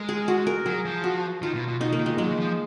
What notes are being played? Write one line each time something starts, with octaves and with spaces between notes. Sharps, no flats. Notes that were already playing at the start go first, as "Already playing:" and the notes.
Already playing: G#3 A#4
G#4
F#4
A#4
F#3 G#4
F3
F#4
D#3 F4
B2
B2
B2 D#4
A#3
D#3
G#3
F#3 G#3
D#3
F3